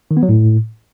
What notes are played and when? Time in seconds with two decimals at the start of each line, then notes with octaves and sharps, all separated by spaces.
0.11 D#3
0.17 B3
0.23 F#3
0.29 A2